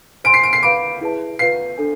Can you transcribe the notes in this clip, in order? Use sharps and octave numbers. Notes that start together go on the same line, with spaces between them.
C5 G#5 C6 D7
C7
D7
C7
B4 F5 B5 D6 D7
E4 G#4 B4 E5 A5
F4 B4 F5 C7
D4 A4 C5 G#5